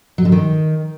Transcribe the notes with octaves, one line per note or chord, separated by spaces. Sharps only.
F#3
D3
D#3